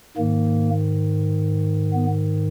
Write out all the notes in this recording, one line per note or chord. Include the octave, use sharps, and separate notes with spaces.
G#2 D#3 A#3
B3